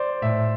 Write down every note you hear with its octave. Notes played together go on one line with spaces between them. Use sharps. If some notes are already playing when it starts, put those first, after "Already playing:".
Already playing: C5 D5
A2 E5